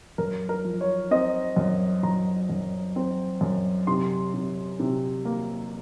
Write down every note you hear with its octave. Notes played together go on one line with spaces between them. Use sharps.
F#2 A#4
A#4
F3
C#5
C4 D#5
F#2
F#2 A#5
F#2
C4
F#2
C3 C6
C3
C3
A#3